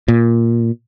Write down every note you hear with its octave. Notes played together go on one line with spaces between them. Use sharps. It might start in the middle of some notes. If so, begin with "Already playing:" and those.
A#2